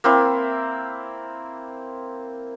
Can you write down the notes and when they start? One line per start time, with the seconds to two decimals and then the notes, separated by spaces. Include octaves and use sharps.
0.04 A#3 C4 E4